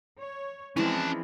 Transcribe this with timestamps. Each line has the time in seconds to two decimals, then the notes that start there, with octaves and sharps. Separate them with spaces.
0.19 C#5
0.77 E3 F3 G#3 C4 C#4 A#4 D5 A5